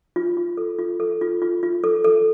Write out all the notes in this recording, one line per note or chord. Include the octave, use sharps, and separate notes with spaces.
F4
F4
A4
F4
A4
F4
F4
F4
A4
A4